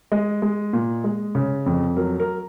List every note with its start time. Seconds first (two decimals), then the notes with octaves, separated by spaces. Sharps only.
0.12 G#3 D#5
0.42 G#3
0.73 A#2
1.04 G#3
1.35 C#3
1.66 F2
1.96 F#3 A#4
2.20 A#4